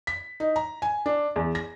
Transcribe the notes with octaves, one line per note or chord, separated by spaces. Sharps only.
B6
D#4
A#5
G#5
D4
E2
A#6